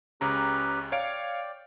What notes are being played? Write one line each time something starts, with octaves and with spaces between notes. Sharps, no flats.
C#2 C#3 C#4 G4 B4 A#5
C#5 D5 F5 G5 D7